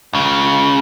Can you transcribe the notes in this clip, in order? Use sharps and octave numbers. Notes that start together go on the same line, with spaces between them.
C#2 C#3